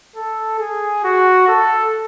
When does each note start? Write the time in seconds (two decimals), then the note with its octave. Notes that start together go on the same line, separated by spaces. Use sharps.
0.16 A4
0.59 G#4
1.04 F#4
1.48 A4